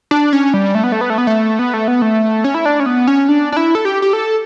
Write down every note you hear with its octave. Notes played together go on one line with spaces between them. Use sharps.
D4
C#4
G3
A3
B3
A3
B3
A3
B3
A3
B3
A3
B3
A3
C#4
E4
D4
C#4
B3
C#4
D4
D4
E4
A4
G4
G4
A4